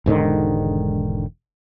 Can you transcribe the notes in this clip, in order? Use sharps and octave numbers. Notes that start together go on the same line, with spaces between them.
E1 G#2 D3 D#3